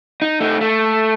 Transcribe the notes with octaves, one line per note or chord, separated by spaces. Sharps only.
D#4
A3 D#4
A3